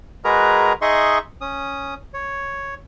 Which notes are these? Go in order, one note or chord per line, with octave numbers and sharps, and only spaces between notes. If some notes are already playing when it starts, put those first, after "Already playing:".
G#3 F#4 G#4 A#4 B4 A#5
D#4 G#4 D#5 E5 C6 C#6
C#4 D#6
C#5